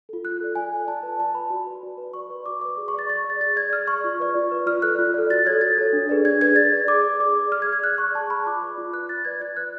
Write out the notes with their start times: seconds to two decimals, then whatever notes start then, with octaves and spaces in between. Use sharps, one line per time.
0.09 F4 A4
0.24 F4 F#6
0.41 A4 D5
0.55 F4 G#5
0.72 A4 D5
0.88 F4 A5
1.03 B4 D5
1.19 F4 A5
1.35 B4 D5 B5
1.50 F#4
1.67 B4 D5
1.83 F#4
1.98 B4
2.03 D5
2.14 F#4 C#6
2.30 B4 D5
2.46 F#4 D6
2.61 B4 D5 D6
2.77 G#4
2.88 C#6
2.94 D5 A6
3.09 G#4 A6
3.24 D5
3.30 A6
3.41 G#4 A6
3.57 D5 G#6
3.72 G#4 F6
3.88 D5 C#6
4.04 F4
4.20 B4 D5
4.35 F4
4.51 B4 D5
4.66 F4 F6
4.82 A4 D5 F#6
4.99 F4
5.14 A4 D5
5.30 F#4 A6
5.46 A4 C#5 G#6
5.61 F#4 A6
5.78 A4 C#5
5.93 D4
6.09 G#4 B4 D5
6.25 D4 G#6
6.41 G#4 B4 D5 G#6
6.56 G#4 A6
6.72 D5
6.88 G#4 D6
7.03 D5
7.20 G#4 D6
7.35 D5
7.52 G#4 F6
7.62 G#6
7.67 D5
7.73 G#6
7.83 G#4 F#6
7.98 D5 C#6
8.15 G#4 A5
8.30 D5 B5
8.46 F4 D6
8.62 B4 D5
8.78 F4
8.93 B4 D5 F#6
9.09 F4 A6
9.25 B4 D5 G#6
9.41 F4 G#6
9.57 B4 D5 F#6